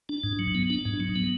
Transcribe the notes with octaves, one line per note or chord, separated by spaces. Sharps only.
D4
G#2
F#3
B3
D4
G#2
F#3
B3